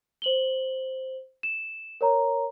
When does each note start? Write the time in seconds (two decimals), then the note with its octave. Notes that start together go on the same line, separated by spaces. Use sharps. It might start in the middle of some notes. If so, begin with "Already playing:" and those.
0.22 C5 F#7 G7
1.43 E7
2.01 A#4 C#5 A#5